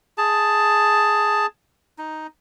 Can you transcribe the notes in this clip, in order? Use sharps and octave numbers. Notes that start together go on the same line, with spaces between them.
G#4 A5
D#4